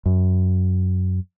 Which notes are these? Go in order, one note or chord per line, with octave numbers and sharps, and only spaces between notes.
F#2